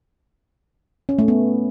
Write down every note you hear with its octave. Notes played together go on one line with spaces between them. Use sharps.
C#4
A3
B3